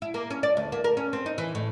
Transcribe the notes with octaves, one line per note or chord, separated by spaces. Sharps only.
E4
A#3
C#4
D5
D2
A#3
A#4
C#4
C4
D#4
E3
A2